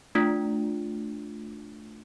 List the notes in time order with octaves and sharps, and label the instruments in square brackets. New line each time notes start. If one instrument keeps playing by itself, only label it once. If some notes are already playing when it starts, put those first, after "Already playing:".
[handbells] A3 D4 F4